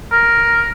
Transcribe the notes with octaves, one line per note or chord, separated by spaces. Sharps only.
A#4